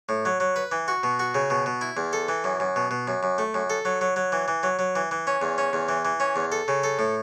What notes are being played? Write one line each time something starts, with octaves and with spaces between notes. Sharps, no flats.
A2
F#3
F#3
B4
E3
F#4
B2
F#4
C#3
B2
B2
E4
E2
A4
E3
F#2
F#2
B2
B2
F#2
F#2
A3
F#2
A4
F#3
F#3
F#3
E3
E3
F#3
F#3
E3
E3
C#4
E2
C#4
E2
E3
E3
C#4
E2
A4
C#3
A4
A2